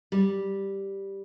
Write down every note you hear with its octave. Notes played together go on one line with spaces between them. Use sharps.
G3